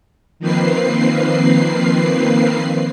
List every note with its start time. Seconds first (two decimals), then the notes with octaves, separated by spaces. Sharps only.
0.39 D#3 F3 A#3 C4 B4 C7